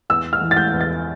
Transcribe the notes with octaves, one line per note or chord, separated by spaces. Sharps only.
E2 E6
F6
E3
A6
G6
E2
A6